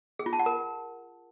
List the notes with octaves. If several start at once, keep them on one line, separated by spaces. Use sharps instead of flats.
G#4
F4
A5
F#5
A#4